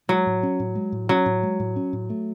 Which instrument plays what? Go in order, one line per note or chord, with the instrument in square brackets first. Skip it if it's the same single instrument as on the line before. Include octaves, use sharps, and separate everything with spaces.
[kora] F#3 [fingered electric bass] G#3
[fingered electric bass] A2
C#4
A2
G#3
A2
[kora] F#3 [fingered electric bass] C#4
[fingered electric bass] A2
G#3
A2
C#4
A2
A3